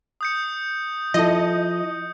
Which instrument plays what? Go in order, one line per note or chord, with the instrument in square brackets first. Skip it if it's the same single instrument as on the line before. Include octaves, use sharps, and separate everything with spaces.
[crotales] D#6 G6 C#7
[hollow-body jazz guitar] F3 E4 A4 [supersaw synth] D#5